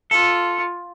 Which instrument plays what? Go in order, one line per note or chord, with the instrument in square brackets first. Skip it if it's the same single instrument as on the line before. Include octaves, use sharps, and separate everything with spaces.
[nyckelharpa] F4 [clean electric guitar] A4